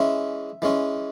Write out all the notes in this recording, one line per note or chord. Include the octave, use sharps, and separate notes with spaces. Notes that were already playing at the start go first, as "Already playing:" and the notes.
Already playing: E3 G#3 C#4 E5
E3 G#3 C#4